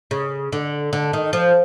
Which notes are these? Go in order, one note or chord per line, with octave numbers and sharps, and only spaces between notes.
C#3
D3
D3
D#3
F3